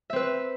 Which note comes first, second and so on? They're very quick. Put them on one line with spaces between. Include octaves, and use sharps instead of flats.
E5 C4 B4